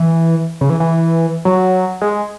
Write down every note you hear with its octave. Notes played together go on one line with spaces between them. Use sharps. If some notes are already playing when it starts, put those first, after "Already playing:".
Already playing: E3
C#3
E3
E3
F#3
G#3